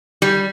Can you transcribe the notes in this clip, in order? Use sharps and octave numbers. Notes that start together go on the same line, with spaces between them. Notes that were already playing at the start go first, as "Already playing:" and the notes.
G3